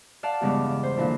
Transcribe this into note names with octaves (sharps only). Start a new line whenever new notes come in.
D5 F5 F#5 A5
E2 G2 C#3 G#3 B3 D6
C5
A#2 D3 E3 F3 D4 E4